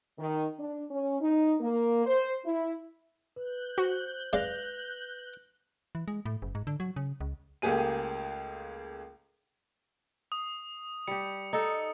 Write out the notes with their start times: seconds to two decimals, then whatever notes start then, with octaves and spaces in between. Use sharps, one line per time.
0.19 D#3
0.59 D4
0.91 C#4
1.21 D#4
1.61 A#3
2.06 C5
2.45 E4
3.36 B4 F#6 G6
3.78 F#4 C5
4.33 G#3 B4 D5 F5 A#6 F7
5.95 E3
6.08 G#3
6.25 A2
6.42 F#1
6.55 G#2
6.67 D3
6.80 F#3
6.96 C#3
7.21 C#2
7.62 C#2 A3 A#3 G4 G#4 D#7
10.32 D#6
11.08 G3 G4 C#7
11.53 D#4 A4